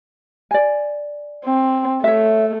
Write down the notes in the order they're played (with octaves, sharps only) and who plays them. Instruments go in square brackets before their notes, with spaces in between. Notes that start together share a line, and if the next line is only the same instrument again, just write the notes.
[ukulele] D5 G#5
[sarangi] C4
[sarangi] A3 [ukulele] C#5 E5